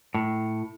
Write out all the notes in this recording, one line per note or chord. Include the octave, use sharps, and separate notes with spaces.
A2